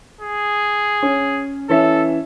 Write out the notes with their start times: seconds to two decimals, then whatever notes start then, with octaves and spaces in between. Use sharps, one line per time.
0.21 G#4
1.03 C#4
1.69 E3 C#4 A4 E5